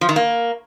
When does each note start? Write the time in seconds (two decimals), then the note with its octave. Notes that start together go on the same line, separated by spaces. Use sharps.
0.01 F3
0.09 D#3
0.16 A#3